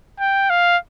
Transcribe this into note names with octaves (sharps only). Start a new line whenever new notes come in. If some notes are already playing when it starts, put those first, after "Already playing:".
G5
F5